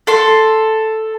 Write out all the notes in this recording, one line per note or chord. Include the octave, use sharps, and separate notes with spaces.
A4 C6